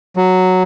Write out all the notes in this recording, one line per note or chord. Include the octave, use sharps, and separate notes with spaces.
F#3